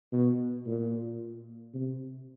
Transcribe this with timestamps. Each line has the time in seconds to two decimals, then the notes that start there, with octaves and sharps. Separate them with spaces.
0.12 B2
0.66 A#2
1.74 C3